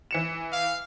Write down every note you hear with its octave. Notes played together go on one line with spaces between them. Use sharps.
E3 C#7 E7
F5